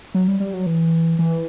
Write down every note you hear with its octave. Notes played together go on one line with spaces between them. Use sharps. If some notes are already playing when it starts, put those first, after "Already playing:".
F#3
G3
G3
F#3
E3
E3